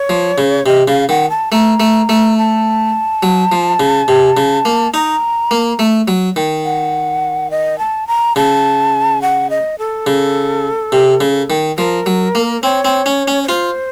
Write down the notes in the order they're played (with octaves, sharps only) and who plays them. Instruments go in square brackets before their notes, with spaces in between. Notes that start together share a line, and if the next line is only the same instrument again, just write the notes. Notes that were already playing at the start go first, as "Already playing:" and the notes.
Already playing: [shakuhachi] C#5
[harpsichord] F3
C#3
[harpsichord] C3 [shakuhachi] D#5
[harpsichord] C#3 [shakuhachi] F5
[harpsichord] D#3 [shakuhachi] F#5
[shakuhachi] A5
[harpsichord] A3 [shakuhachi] A#5
[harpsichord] A3
A3
[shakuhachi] A5
[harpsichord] F#3
F3
C#3
C3
C#3
A#3
[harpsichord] D#4 [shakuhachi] A#5
[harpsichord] A#3
A3
F#3
D#3
[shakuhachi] F#5
D#5
A5
A#5
[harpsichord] C#3 [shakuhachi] A5
[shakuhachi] F#5
D#5
A4
[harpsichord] C#3
C3
C#3
D#3
[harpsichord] F3 [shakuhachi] A#4
[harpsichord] F#3
A#3
[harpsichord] C4 [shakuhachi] C#5
[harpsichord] C4
C#4
C#4
[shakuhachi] C#5
[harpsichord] F4 [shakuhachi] C5